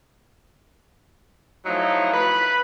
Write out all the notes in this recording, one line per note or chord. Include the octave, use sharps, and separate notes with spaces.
F3 F#3 A3 D#4 E4
B4 B5